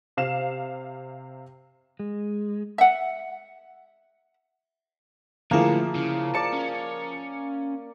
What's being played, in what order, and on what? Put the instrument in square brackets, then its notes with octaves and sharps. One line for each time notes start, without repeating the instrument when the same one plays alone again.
[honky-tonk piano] C3 F5 E7
[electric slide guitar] G#3
[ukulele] E5 F#5
[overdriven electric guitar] A2 [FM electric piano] D3 E4 [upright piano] F3 G#4 A#4 [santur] A#3
[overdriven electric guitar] C#3
[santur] D5 A#5 [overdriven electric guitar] A5 [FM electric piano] C#7
[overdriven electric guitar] C#4